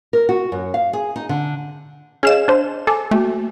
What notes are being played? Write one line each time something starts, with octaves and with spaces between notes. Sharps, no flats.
A#4
F#4
F#2
F5
G#4
D#4
D3
C#4 G#4 D#5 F5 E7
D4 C5
A4 G#5 D6
A3 A#3 F#4